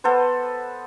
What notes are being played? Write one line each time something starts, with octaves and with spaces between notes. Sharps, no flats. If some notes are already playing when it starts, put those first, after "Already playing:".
B3 A4 B4 C5